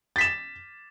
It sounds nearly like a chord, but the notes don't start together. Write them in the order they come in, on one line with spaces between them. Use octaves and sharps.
A6 B6 E7